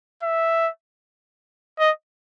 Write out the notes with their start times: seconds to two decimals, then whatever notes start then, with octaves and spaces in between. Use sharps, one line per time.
0.23 E5
1.79 D#5